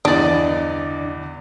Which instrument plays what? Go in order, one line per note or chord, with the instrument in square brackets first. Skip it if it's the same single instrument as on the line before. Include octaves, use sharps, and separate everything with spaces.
[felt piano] E2 G2 E3 [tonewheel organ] D3 [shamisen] D4 [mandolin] D5 D#5